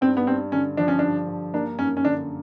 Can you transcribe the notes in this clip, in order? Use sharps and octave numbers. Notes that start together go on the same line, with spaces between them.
G2 C4
B3
G2 C4
D3 C#4
F3 D4
C#4
G2 D4
G2
A#3 D4
F#2 C#4
C#4
D3 D4